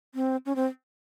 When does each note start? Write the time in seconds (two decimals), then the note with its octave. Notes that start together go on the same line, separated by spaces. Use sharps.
0.15 C4
0.46 C#4
0.56 C4